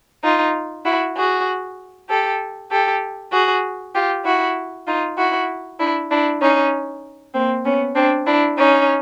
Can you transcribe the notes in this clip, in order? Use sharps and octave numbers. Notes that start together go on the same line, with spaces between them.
D#4 F4
E4 F#4
F#4 G#4
G4 A4
G4 A4
F#4 G#4
F4 G4
E4 F#4
D#4 F4
E4 F#4
D4 E4
D4 E4
C#4 D#4
A#3 C4
B3 C#4
C4 D4
D4 E4
C#4 D#4